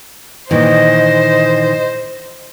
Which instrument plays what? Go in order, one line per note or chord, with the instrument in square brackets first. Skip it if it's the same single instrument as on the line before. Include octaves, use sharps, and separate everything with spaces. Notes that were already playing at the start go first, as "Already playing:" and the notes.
[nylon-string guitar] A#2 D#3 E3 [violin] C5 [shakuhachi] D#5